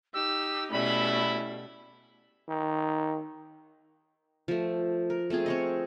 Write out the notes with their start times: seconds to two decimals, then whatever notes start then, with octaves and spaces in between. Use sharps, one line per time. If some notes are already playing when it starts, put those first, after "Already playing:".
0.14 D#4 G4 E6
0.71 B2 G3 A3 C#4 E4 B5
2.48 D#3
4.48 F3 A3
5.10 A#4
5.30 A3 C4 F4 G#4
5.46 C4 C#5 D#5